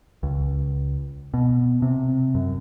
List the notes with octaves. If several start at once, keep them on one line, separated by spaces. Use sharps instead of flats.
C#2
B2
C3
F#2